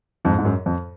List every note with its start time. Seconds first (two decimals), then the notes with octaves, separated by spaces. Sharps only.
0.25 F2 G#2
0.39 G#2
0.45 F#2
0.66 F2